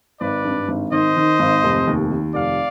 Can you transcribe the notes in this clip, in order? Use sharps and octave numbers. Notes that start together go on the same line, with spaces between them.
G#1 B4 D5
G2
G#1
D#3 C5 D#5
D#3
G#1
F1
D#2
D#3
F1 D5 F5